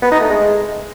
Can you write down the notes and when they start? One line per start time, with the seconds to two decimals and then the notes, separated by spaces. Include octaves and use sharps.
0.02 B3
0.12 D#4
0.21 A3
0.30 G#3